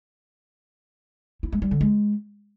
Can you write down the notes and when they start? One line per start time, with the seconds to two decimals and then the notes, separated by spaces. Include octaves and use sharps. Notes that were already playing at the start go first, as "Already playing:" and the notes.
1.43 E4
1.52 G#3
1.62 G3
1.71 D3
1.81 G#3